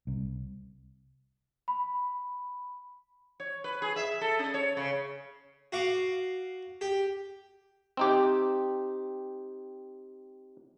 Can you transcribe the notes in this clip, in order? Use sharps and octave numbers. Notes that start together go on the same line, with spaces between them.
C2
B5
C#5
B4
G#4
E5
A4
C#4
C#5
C#3
F#4 F5 D6
G4
C4 D#4 G4